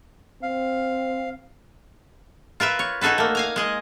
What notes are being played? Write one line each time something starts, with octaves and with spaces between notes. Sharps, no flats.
C4 F5
F4 A#4 B4 E5
C#5
D#4 F#4 G#4 A4 B4
A3 A#3
F5 G#5 A#5
G#3 G#4 D#5